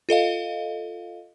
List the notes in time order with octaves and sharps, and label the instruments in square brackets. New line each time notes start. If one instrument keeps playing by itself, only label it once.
[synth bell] F4 A4 D#5 F5